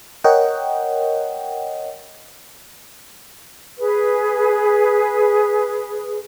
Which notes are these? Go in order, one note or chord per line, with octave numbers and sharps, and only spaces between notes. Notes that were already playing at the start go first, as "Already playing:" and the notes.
A#4 C#5 D#5 F#5 G5
G#4 B4